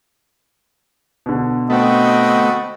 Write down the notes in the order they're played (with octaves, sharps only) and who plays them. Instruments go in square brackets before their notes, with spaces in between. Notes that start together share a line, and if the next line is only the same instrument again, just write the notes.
[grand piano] B2 D3
[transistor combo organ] A3 B3 [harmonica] C4 F#4 G5 [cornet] D#5